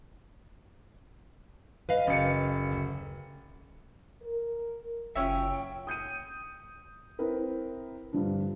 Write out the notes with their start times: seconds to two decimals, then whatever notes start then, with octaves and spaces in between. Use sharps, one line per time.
1.89 B4 D#5 F5
2.07 F#1 C#7
2.71 D2
4.22 A#4
5.16 F#1 F#3 C#4 F4 E5 G5
5.87 D#6 G6 C#7 D#7
7.19 C4 E4 A#4 B4
8.13 G2 D3 F3 D4